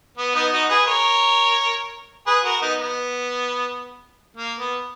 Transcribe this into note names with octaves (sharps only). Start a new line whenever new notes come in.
B3
B3 D#4
D#4 F#4
G#4 B4
A#4 C#5
G#4 B4
F#4 A#4
B3 D#4
B3
A#3
B3